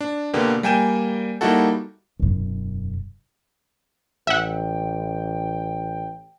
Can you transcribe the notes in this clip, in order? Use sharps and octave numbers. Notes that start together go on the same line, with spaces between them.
D4
B2 D3 A#3 B3 G4
G3 A#3 G5 G#5 G6 E7
G3 A#3 D#4 E4 F#4 A4
E1 F#2
A1 E5 F#5 G5